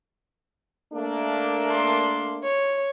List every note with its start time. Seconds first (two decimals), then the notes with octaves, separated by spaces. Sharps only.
0.93 A3 A#3 D4
1.72 C6
2.44 C#5